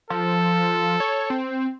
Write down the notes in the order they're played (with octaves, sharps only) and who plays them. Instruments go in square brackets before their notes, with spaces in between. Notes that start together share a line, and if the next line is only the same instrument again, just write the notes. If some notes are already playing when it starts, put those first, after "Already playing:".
[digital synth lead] F3 [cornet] A4
[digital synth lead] C#5
C4